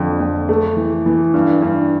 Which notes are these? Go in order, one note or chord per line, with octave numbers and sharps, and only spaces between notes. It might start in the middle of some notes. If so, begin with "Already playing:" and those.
Already playing: F2 D3
F2
A3
E3
E3
G2
G2